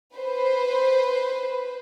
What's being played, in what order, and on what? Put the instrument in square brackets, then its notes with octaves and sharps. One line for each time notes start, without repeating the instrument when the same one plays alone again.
[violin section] B4 C5